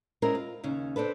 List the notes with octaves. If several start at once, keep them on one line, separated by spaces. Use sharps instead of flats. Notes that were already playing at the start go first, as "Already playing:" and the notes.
G#3 C4 C#4 E4 A#4
F4
D#2 C#3 C#4
C4 D4 A4 B4